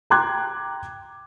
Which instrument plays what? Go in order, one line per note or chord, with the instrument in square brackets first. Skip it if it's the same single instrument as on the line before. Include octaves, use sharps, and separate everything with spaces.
[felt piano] G5 A#5 C6 D6 F#6 G#6